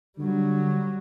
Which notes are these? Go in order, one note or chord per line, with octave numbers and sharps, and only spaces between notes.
D3 F#3 G3